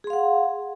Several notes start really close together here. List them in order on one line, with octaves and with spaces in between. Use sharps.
G#4 C6 F5 F#5